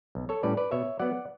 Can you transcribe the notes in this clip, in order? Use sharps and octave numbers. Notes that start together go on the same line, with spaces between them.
B1
A4 C#5
A2 G3 C#4 B4 D5
B4 D5
B2 C#5 E5
F#3 B3 D5 F#5